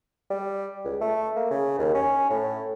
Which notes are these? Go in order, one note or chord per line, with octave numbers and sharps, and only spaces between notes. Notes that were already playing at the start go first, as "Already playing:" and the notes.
G3
C#2
A3
A#3
C#3
D#2
C#4
A2